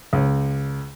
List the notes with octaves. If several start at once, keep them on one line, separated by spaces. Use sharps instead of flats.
C#2